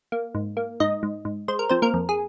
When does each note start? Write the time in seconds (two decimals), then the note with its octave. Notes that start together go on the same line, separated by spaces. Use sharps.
0.12 A#3
0.35 G#2
0.57 A#3
0.80 G#2 D#4 D#5
1.03 G#2
1.25 G#2
1.48 G#3 C5
1.59 A#4
1.69 F3 C4 C5
1.82 A#3 A#4
1.94 F2
2.09 G#4